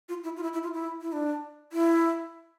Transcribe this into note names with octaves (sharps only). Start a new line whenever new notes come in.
F4
E4
F4
E4
E4
F4
E4
E4
D4
E4